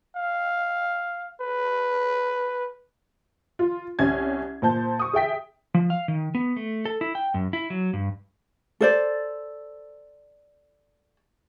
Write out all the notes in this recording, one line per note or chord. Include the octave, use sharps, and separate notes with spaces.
F5
B4
F4
C2 C#4 G#6
A#2 C5 A5 G6
C#6 D#6
G#4 E5 G5 B6
F3
F5
D#3
B3
A3
A4
E4
G5
F#2
E4
F#3
G2
A4 C5 D5